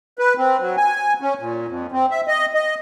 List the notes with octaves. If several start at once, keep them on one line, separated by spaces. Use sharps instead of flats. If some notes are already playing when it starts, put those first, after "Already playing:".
B4
C4
F#3
G#5
C#4
A#2
F2
C4
E5
D#5
D#5